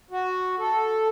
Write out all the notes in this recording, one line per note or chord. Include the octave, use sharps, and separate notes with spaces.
F#4
A4